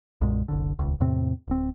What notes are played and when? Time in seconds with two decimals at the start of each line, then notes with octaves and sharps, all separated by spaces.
0.21 B1 F#2 A#2 G#3
0.48 F#1 C2 D3
0.79 D#1 C#2
1.00 E2 A2 C3 C4
1.48 D1 C4